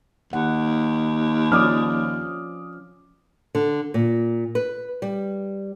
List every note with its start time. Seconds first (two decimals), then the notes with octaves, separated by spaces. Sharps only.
0.33 D#2 F#5
1.52 F3 C#4 D5 D6 D#6 F6
3.55 D3
3.94 A#2
4.55 B4
5.02 G3